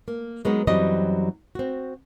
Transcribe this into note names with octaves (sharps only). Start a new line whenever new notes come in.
A#3
F#3 G#3 A#3 B3 D#4
F#2 E3 F#3 G3 C4 D#5
C4 F#4